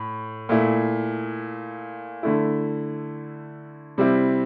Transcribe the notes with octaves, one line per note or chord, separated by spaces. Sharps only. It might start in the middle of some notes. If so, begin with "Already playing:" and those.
Already playing: A2
A#2 A3 E4
D3 A3 E4
C3 G3 C4 E4